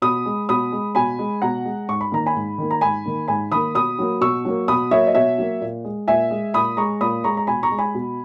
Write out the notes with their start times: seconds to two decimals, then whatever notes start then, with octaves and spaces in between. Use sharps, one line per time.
0.02 B2 B5 D#6
0.25 G#3
0.49 B2 B5 D#6
0.72 G#3
0.95 B2 G#5 B5
1.19 G#3
1.42 B2 F#5 A#5
1.65 G#3
1.88 G#2 C#6
2.01 B5
2.12 D#3 A#3 A#5
2.26 G#5 B5
2.35 G#2
2.58 D#3 A#3
2.71 A#5
2.81 G#2 G#5 B5
3.05 D#3 A#3
3.28 G#2 G#5 B5
3.52 D#3 A#3 B5 D#6
3.75 B2 B5 D#6
3.99 F#3 A#3
4.21 B2 C#6 E6
4.45 F#3 A#3
4.68 B2 B5 D#6
4.91 F#3 A#3 C#5 E5
5.07 D#5
5.15 B2 C#5 E5
5.38 F#3 A#3
5.61 A#2
5.85 G#3
6.08 A#2 E5 G#5
6.31 G#3
6.54 A#2 B5 D#6
6.77 G#3 A#5 C#6
7.01 A#2 B5 D#6
7.24 G#3 A#5 C#6
7.37 A#5
7.47 B2 G#5 B5
7.63 A#5 C#6
7.71 G#3
7.79 G#5 B5
7.94 B2